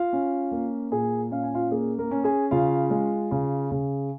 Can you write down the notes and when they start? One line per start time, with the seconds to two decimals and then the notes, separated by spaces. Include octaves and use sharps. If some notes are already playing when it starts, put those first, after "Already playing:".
Already playing: F4 F5
0.13 C#4
0.52 A#3
0.92 A#2 G#4 G#5
1.31 C#4 F5
1.43 G#5
1.54 F4 F5
1.71 A#3 G#4
1.98 A#3 A#4
2.11 C#4
2.24 G#4 G#5
2.51 C#3 F4 F5
2.90 G#3
3.31 C#3
3.71 C#3